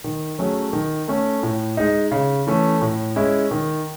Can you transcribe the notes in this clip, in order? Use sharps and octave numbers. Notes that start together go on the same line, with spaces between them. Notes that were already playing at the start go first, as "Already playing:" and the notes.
D#3
F#3 A3 C#4 G#4
D#3
A3 C#4
A2
G#3 D#4
C#3
E3 A3 C#4
A2
G#3 C#4 E4
D#3